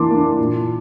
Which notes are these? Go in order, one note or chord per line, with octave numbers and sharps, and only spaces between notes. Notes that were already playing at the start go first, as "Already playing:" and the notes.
Already playing: E3 A#3 D4 A5 C6 D6
A#3 D4
A#2